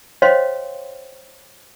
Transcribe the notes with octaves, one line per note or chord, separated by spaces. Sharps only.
C5 C#5 D#5 F5 G5 C6